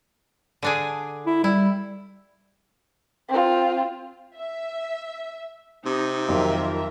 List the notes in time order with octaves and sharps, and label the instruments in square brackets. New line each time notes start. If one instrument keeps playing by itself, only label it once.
[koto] D3 D4 G#4
[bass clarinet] E4
[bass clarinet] G3 [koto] E4
[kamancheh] C4 F4
[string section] E5
[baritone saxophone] C3 [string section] D#4
[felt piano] F2 D#3 F#3 [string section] F4 A#4 E5